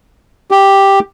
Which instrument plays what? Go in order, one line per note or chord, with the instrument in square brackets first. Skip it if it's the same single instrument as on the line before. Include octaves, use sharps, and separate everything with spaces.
[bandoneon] G4